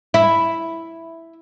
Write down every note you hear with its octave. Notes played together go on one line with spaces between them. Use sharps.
E4